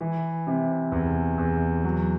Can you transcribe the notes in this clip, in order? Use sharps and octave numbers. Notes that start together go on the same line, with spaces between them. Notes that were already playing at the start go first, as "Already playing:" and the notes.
E3
C3
E2
E2
F#3